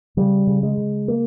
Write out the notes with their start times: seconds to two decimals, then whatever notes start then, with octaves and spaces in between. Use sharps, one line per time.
0.17 C#3 G3
0.47 C#3
0.63 G#3
0.78 C#3
1.08 A#3